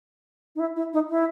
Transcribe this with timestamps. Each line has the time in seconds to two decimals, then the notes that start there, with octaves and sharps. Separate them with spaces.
0.56 D#4
0.60 E4
0.76 E4
0.93 D#4
1.10 E4